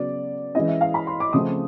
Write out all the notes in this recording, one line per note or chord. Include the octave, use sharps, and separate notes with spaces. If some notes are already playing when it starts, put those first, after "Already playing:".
Already playing: C#3 F#3 B3 D5
E3 G#3 C#4 E4 D#5
E5
F5
B5
C6
D6
C#3 F3 A3 C4 D#6